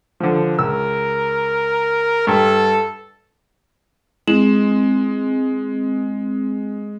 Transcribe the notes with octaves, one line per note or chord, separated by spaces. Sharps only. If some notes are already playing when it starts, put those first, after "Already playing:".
D3 F3
C#2 A#4 E6
G2 A4
G#3 C4 E4 E7 F#7